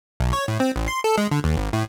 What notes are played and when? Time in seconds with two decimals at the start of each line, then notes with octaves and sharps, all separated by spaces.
0.20 B1
0.33 C#5
0.48 A2
0.60 C4
0.76 A1
0.88 C6
1.04 A4
1.18 G#3
1.31 D3
1.44 D#2
1.57 G#1
1.73 A2